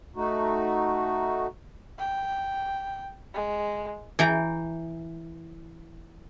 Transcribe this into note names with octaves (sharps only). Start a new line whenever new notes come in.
A3 D#4 F#4
G5
G#3
E3 G5 A#5